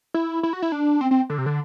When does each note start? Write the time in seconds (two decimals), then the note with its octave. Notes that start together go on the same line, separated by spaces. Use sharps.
0.14 E4
0.43 E4
0.53 F#4
0.62 E4
0.72 D4
1.01 C4
1.11 C4
1.30 D3
1.38 C3
1.46 D3